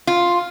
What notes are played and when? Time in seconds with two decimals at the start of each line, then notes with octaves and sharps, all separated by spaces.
0.07 F4